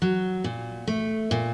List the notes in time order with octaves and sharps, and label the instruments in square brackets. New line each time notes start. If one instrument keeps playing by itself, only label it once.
[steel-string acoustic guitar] F#3
A#2
A3
A#2